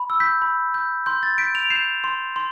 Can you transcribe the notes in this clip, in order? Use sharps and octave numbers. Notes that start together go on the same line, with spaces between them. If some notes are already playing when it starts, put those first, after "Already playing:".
Already playing: B5
E6
G6 B6
B5
G6
C6 G6
A6
G6 B6 D7
D7 F7
G6 C7 E7
C6
C6